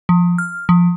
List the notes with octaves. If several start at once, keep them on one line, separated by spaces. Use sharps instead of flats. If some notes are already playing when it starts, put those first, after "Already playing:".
F3
F6
F3